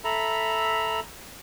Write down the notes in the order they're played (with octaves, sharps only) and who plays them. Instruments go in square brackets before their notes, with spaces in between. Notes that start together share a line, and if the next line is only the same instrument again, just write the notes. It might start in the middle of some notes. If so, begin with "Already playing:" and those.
[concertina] A4 E5 A#5 B5